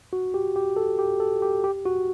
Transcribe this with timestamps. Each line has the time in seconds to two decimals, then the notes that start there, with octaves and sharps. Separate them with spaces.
0.13 F#4
0.34 G4
0.56 G4
0.77 A4
0.99 G4
1.20 A4
1.42 G4
1.64 G4
1.86 F#4